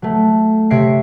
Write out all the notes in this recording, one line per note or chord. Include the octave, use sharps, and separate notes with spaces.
F#3 A3
C3 C#5 E5 A#6 C7 D7